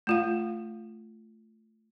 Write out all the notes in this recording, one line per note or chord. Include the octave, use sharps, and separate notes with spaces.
A3 F4 F5